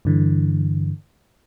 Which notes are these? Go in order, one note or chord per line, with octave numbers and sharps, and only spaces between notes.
G2 D3 E3